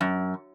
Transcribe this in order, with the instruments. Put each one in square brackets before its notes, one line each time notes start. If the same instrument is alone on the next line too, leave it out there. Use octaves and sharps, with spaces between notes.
[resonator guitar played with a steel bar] F#2